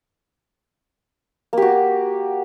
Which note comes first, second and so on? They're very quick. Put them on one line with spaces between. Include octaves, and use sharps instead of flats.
A#3 G4 F#4